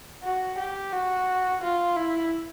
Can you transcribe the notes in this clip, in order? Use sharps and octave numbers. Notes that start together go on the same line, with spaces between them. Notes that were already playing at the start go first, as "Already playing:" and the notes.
F#4
G4
F#4
F4
E4